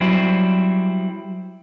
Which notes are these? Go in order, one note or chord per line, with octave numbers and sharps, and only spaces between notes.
F#3 G3 C4 E4